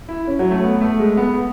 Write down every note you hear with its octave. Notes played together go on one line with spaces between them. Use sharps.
E4
C#4
F#3
A3
B3
A3
G#3
B3